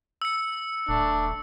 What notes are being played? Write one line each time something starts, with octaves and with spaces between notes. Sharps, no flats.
E6 C#7
D#1 A3 D4